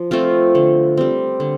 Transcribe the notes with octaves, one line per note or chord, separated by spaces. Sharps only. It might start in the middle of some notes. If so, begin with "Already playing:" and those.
Already playing: F3
A3 C4 F4
D3
G3 C4
D3